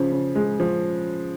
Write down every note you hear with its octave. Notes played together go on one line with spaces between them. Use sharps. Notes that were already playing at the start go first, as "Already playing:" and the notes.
Already playing: C#3 F3
C#3
G#3
F3